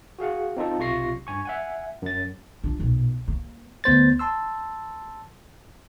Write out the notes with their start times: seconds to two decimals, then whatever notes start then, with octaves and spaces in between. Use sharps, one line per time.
0.19 F#4 G#4 F5 F#5
0.57 C4 D#4 F4 A4
0.79 B1 C3 F4 C#6 A#6 C7
1.27 G2 G#5 C#6
1.45 E5 F#5 G#5
2.02 F#2 A6
2.64 D4 F4
2.79 B1 A#2
3.28 A#3
3.84 D2 B3 C5 A6
4.19 A5 C6 E6